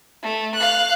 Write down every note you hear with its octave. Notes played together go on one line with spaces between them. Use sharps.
A3
F5 F#6